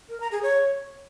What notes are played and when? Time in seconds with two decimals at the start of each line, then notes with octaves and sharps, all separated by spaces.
0.09 A#4
0.20 A#5
0.31 G#4
0.43 C#5